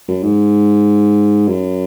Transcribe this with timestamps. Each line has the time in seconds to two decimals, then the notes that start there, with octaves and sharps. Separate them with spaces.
0.08 F#2
0.23 G#2
1.48 F#2